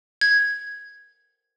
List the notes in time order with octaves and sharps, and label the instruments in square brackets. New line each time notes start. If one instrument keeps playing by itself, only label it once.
[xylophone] G#6